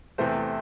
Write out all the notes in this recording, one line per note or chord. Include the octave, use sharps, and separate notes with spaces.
E2 C3 E3 A3 C4 C5